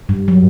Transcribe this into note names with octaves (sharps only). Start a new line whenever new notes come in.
G2 G3
F#3